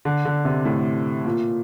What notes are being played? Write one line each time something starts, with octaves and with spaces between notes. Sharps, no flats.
D3
D3
C3
A2
A#2